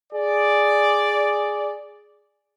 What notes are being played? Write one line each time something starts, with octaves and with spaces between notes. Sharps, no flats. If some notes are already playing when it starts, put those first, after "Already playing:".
G#4 D5